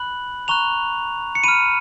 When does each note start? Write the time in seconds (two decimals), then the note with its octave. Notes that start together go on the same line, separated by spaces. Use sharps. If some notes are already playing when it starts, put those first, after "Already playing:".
Already playing: B5 F#6 F#7
0.48 A#5 C#6 F#6 F7
1.35 C#7
1.44 B5 F6 D#7